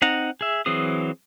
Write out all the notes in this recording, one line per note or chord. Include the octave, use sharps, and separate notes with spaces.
C4 D#4 F#5 A#5
G#4 E5
E3 F#3 C4 G#4 D#6